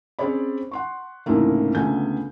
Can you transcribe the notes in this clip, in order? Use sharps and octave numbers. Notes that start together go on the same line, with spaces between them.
C4 C#4 G#4 C#5 D5 B5
F#5 C6 C#6
C2 G#2 C#3 E3 A3 A#3
C#2 D3 A3 B3 G#5 G6